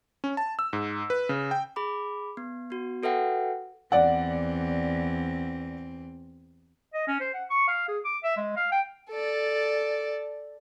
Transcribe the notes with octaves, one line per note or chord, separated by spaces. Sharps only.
C#4
A5
E6
G#2
B4
C#3
G5
G#4 B5 D6
B3
B3 F#4
F#4 A4 B4 E5 F#5 G5
E2 C4 D5 F#5
D#5
C#4
C5
F#5
C#6
F5
G#4
D6
E5
G#3
F5
G5
A4 D5